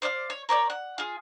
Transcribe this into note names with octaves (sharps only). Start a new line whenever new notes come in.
C5 D5 D#5 F5
C#5
A#4 C#5 D5 G6
F#5
F4 G#4